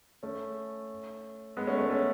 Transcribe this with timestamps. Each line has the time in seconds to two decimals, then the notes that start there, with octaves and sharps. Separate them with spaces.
0.23 A3 C#4
1.57 G#3 B3
1.67 A3 C#4
1.78 A3 C#4
1.90 A3 C#4